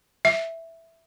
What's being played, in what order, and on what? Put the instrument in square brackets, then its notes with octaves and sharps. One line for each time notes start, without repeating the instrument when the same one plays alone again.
[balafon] E5